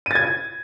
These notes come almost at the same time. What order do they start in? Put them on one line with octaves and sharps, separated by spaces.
D#7 A6 G#6